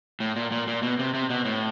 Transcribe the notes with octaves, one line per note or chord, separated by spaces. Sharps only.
A2
A#2
A#2
A#2
B2
C3
C3
B2
A2